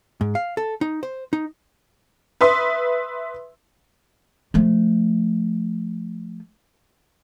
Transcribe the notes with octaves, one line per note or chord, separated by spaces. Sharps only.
G#2
F5
A4
D#4
C5
D#4
B4 E5 C6 D#6
F3 A3